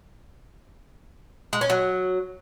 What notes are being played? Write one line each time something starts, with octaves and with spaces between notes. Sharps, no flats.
G#3
C#4
F#3